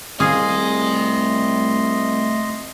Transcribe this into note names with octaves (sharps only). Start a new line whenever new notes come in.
C2 A3 G#4 D#5 F5 G#5 C6